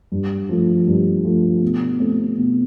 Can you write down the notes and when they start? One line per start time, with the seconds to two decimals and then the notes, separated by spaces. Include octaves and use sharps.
0.12 G2
0.49 F3 A3
0.87 G2
1.25 F3 A3
1.62 B2
2.00 A3 C4
2.38 B2